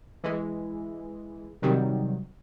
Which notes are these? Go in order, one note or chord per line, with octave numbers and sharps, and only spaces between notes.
E3 G#3
C3 D#3 F#3 G3